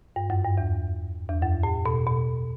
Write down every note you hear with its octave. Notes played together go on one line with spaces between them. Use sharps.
G2
F#2
G2
E2
E2
F#2
A2
B2
B2